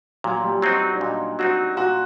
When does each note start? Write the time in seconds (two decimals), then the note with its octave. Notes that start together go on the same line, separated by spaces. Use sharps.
0.24 A#2 F#3
0.44 G3
0.62 F#3 C4 D#4 F#4
0.81 F#4
0.96 D4
1.01 A#2 D#4
1.39 F#3 C4 D#4 F#4
1.77 A#2 F#4